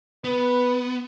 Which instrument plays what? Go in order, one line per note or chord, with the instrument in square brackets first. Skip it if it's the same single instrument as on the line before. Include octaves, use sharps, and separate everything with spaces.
[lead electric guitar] B3 [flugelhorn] B4